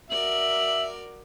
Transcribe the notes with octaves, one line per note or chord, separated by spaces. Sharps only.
F#4 A#4 D5 E5 F#7